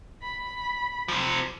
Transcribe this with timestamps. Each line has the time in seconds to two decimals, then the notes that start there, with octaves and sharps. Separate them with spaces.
0.23 B5
1.08 C3 F3